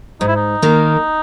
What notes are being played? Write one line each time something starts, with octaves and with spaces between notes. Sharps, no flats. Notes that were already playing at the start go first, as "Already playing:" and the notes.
G#2 D#4
E4
D#4
D#3 A#3